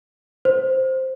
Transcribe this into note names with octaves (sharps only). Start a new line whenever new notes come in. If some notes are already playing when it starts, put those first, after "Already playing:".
C5